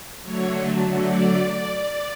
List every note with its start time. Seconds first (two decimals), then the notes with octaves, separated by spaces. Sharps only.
0.22 D3 F#3 A3 C#5
1.03 D5